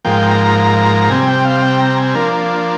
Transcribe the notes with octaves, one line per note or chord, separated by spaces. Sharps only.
G#2 F3 A#3 G5
A#5
C3 G3 C4 G#5
G5
F5
G5
A#5
G#5
F3 A#3 D4 A#4